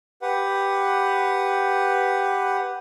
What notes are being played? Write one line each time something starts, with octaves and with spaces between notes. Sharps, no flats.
G4 B4 F#5